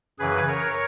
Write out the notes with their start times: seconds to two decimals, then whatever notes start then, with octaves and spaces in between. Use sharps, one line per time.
0.19 F#2 C#3 E3 G#4 B4
0.47 A#4 C#5